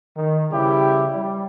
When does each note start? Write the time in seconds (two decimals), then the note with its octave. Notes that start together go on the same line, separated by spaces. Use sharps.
0.17 D#3
0.51 C#3 F3 G3 E4 G4
1.15 G3